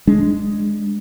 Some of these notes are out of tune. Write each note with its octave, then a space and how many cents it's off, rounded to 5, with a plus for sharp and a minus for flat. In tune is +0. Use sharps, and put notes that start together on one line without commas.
G#3 +0 D4 +0